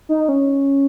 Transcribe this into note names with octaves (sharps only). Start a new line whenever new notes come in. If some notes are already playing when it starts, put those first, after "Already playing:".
D#4
C#4